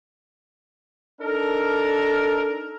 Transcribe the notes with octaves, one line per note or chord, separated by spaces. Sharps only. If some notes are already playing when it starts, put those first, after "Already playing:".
D4 D#4 A4 A#4